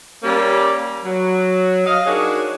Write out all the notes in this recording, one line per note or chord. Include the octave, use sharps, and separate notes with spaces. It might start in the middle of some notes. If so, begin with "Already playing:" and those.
G3 A#3 C#4
F#3
D#5 F5
D4 D#4 F#4 G#4 A#4 C#5